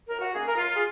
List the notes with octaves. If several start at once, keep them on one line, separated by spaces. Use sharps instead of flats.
F#2 A#4
F#4
D#3 A#3 C#4 G#4
A#4
F#2 F4
G#4